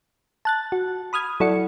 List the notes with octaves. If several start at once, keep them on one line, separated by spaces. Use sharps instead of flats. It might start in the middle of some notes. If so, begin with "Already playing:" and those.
A5 F#6 A6
F#4
B5 D#6 F6 G#6
F#3 E4 A4 D5 F#5 C#7